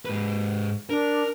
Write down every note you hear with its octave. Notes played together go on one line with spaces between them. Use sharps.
G#2 B4
D4 A#4